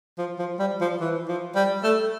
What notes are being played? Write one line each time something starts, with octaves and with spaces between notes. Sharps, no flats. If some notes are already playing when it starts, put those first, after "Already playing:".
F3
F3
G3
F3
E3
F3
G3
A3